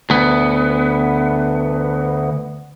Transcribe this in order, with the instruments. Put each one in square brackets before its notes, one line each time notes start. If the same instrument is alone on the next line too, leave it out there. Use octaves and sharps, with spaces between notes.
[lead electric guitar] D2 B3